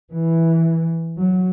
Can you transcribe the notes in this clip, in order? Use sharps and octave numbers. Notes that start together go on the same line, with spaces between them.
E3
F#3